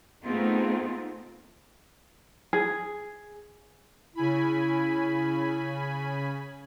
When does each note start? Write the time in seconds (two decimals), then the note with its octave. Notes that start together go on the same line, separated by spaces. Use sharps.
0.24 A3 B3 C4 D#4 F4 G#4
2.53 G#4
4.15 C#3 E4 G#5 B5